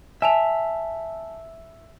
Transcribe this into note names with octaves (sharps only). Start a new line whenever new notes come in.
E5 G#5 A5 F7